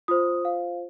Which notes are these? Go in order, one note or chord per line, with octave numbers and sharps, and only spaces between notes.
F4 C5 D#6
F5